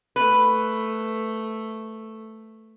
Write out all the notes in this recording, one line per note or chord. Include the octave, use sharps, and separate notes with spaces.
A3 B4